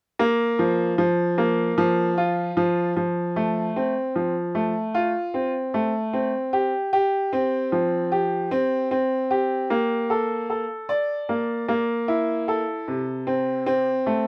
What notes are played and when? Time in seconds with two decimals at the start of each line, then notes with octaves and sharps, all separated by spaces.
0.19 A#3
0.59 F3
0.98 F3
1.38 A#3
1.78 F3
2.18 F4
2.57 F3
2.96 F3
3.36 A3
3.76 C4
4.15 F3
4.55 A3
4.94 F4
5.34 C4
5.74 A3
6.13 C4
6.53 G4
6.93 G4
7.33 C4
7.72 F3
8.12 G4
8.51 C4
8.91 C4
9.31 G4
9.70 A#3
10.10 A4
10.50 A4
10.89 D5
11.29 A#3
11.68 A#3
12.08 E4
12.48 A4
12.88 C3
13.27 C4
13.66 C4
14.06 A3